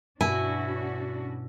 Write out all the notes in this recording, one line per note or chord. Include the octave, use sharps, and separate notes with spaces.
G2 B2 C#4 D4 E4 F#4 G#5